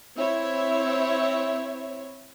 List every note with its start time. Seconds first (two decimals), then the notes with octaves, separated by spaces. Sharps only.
0.17 C4 E4 C#5 E5